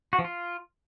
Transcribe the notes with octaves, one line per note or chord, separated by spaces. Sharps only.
F#4
F3
F4